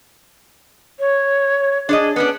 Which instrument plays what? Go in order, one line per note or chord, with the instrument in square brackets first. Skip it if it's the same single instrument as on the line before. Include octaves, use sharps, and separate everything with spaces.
[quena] C#5
[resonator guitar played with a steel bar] D4 C#5 D#5 [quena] G#4
[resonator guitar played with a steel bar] B3 C#4 D4 [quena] B4